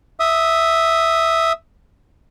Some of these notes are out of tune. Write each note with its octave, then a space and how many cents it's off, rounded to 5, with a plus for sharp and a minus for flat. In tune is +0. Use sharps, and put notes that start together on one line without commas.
E5 +0 D#6 +0